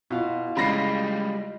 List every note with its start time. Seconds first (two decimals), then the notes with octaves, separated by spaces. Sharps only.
0.10 B2 E4 F4 F5
0.57 C#3 G3 G#3 D#5 B5 A#6 C7